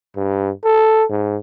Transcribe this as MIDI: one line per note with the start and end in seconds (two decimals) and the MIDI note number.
0.16 0.51 43
0.64 1.04 69
1.10 1.37 44